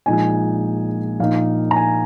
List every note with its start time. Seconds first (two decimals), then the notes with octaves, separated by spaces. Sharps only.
0.06 A#1 A#2 G#3 D#4 G#5
1.20 A#1 A#2 A#3 D#4 F5
1.71 A#5
1.76 G#5